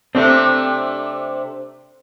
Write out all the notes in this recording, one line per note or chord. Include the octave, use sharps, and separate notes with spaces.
C3 A3 C4 D4